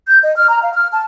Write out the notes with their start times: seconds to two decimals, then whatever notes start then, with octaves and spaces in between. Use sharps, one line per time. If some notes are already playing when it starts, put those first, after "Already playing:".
0.08 G6
0.22 D#5
0.36 F6
0.48 A#5
0.63 F5
0.74 F6
0.93 A5